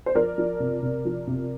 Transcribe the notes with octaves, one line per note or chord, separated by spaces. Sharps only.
C5
F3 A#4 D5
F3
C3
C3
F3
C3